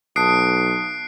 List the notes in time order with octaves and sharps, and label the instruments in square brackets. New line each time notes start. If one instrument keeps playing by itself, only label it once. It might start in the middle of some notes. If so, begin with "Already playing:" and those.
[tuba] B1 [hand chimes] A5 D#6 [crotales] F#6 C7 D7